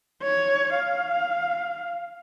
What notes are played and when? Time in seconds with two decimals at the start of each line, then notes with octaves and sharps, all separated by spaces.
0.22 C#5
0.74 F5